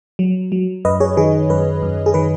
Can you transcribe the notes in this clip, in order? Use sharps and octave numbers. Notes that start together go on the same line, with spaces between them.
F#3
F#3
F#2 B4 D#5
G#4 C#5
D#3 G#4
F#2 B4
F#2
G#4
D#3 B4